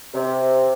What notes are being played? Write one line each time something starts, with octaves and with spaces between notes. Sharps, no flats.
C3